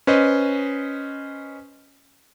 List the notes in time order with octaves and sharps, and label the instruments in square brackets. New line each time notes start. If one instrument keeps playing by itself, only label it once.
[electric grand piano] C#4 B4 C5 D#5